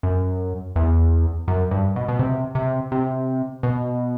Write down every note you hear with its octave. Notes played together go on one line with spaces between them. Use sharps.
F#2
E2
F#2
G2
B2
B2
C3
C3
C3
B2